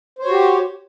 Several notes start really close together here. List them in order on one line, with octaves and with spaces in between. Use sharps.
C5 C#5 F#4 G4